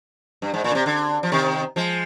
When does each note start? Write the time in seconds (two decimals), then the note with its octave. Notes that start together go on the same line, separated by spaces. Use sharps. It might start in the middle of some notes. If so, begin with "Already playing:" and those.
0.42 G2
0.54 G#2
0.64 A#2
0.71 D3
0.75 C3
0.86 D3
1.23 F3
1.32 C3 D#3
1.76 F3 G#3